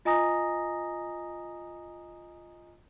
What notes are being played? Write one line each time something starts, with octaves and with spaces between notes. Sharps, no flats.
F4 D#5 G#5 A#5 D#6 A#6